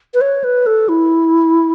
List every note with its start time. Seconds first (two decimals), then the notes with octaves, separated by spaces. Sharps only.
0.14 B4
0.21 C#5
0.44 B4
0.66 A4
0.89 E4